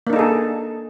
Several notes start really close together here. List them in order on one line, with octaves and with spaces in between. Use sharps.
A#3 D4 D#4 A4 G#4